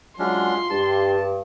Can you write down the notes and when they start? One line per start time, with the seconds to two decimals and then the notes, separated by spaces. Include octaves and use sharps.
0.19 F#3 G#3 C#4 D4 F4 C6
0.70 G2 G4 A5